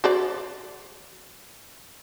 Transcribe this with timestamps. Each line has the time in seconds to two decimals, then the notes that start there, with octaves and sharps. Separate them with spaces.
0.04 F#4 C5 D5